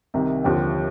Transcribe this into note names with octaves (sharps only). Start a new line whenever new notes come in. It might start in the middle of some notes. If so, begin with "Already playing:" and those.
C2 C3 D#3
D#2 D3 F3 C4 G4